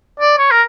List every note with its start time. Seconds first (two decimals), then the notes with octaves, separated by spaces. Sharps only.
0.20 D5
0.38 C#5
0.51 A#4